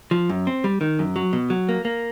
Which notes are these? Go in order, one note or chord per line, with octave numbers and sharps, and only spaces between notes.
F3
F#2
C4
G3
D#3
F#2
F#3
B2
F#3
A#3
A#3